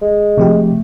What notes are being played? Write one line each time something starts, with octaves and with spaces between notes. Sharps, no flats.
G#3
C3 F3 A3 G4